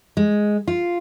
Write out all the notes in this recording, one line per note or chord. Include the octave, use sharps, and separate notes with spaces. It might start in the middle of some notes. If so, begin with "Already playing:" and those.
G#3
F4